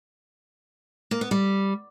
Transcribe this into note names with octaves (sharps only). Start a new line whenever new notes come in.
A#3
B3
G3